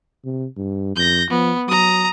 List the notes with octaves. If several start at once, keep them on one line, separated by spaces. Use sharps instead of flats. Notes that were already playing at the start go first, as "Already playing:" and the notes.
C3
G2
F2 G6 A#6
F3 B3
F#3 A#5 D#6